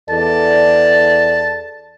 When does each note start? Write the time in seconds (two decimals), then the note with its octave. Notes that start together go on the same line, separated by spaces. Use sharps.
0.10 E2 A4 D5 A5